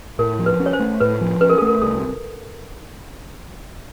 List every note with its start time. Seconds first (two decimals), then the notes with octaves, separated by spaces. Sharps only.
0.19 A2 A#4
0.39 F3
0.46 B4
0.60 C#4
0.66 C#5
0.73 C5
0.79 A3
1.00 A2 B4
1.21 F3
1.41 C#4 B4
1.50 A#4
1.58 A4
1.62 A3
1.67 A#4
1.82 C2 A4